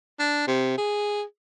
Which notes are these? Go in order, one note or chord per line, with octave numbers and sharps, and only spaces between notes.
D4
C3
G#4